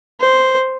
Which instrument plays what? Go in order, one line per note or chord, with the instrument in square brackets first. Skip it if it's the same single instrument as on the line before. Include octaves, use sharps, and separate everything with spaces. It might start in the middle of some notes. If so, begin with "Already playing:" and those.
[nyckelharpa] C5